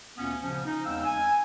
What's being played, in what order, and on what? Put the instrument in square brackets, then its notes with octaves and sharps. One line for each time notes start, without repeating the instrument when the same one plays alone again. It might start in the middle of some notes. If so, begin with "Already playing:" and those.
[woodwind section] D2 A#2 A#3 B3 C#4
C#3 F3 C#4
D#4
E2 G#3 C4 F5 G5 E6
G#5